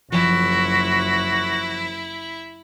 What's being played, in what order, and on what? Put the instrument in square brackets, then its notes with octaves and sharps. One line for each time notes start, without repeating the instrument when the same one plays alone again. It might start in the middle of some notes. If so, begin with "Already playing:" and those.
[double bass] F#1 [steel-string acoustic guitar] F3 [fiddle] E4 [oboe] F#4